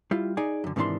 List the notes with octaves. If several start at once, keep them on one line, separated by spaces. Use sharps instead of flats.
G3 E4 F4
D#4 G#4 D5 G#5
F#2 D3
G#2 C3 D#3 E3 D4 C6